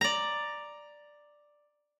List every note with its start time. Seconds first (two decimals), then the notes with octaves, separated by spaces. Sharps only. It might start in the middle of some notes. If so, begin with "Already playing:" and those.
0.01 D5 A#5